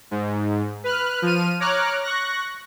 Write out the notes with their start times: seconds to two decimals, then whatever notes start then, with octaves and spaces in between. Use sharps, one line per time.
0.11 G#2
0.84 B4 F6 F#6
1.22 F3 F6 D#7
1.60 C#5 A#5 D6 F6 F#6
2.03 C#6 F#6 A#6